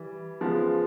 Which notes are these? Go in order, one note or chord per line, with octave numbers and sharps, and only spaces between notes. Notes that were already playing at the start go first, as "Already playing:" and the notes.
Already playing: E3 G3
C#3 F3 G#3 B3